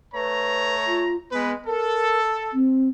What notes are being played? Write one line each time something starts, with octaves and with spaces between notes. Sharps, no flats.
A3 B4 C#5 A#5
F4
G#3 B3 B4
A4 A#4
C4